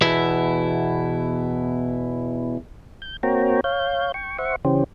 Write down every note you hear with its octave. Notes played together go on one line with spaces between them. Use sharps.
E2 B2 E4 E5
G6
A#3 C4 F#4 C#5 G5 A#5
C#5 F5 G6
G5 C#6
C5 E5 F#5 C#6
C#3 E3 C#4 G4 C5